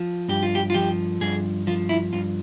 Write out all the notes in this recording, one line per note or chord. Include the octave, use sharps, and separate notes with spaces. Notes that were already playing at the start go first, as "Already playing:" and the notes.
Already playing: F3
G2 G4
F4
G4
F4
F3 G4
G2 G#4
F3 F4
E4
G2 F4